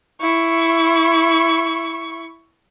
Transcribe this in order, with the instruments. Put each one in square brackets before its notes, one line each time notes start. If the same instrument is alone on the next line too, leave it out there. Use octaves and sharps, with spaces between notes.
[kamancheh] E4 C#6